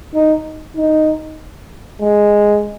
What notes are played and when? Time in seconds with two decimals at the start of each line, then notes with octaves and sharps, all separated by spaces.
0.14 D#4
0.76 D#4
2.01 G#3